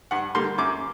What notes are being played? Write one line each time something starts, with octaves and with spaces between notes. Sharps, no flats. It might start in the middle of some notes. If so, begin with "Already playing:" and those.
G2 F#5
D3 G3 A#3 C6
F#2 D6